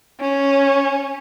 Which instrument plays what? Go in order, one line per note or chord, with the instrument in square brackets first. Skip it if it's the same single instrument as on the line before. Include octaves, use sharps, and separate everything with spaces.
[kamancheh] C#4